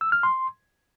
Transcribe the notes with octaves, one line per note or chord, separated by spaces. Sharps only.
E6
F6
C6